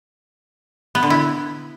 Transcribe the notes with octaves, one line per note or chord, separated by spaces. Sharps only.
B3
D3
E4